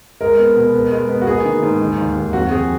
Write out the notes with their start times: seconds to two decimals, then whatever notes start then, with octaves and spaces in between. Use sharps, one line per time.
0.20 G#3 A#4
0.38 B3
0.56 B2
0.74 B3
0.92 G#3
1.09 B3
1.22 F#4
1.27 A#3 G#4
1.45 D#3
1.63 G#2
1.81 D#3
1.98 D#2
2.16 D#2
2.33 F2 F#4
2.51 F2 G#4